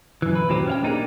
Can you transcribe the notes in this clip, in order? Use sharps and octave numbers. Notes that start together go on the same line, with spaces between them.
F#2 E3
B4
D#2 A#2 F#3 C4 G4 C5
C#4 F5 G5
A#3 D4 D#4 F#4 G#4 A#4